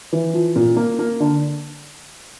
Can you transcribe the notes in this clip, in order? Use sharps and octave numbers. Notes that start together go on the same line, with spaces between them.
E3
F3
A#2
A#3
A#3
D3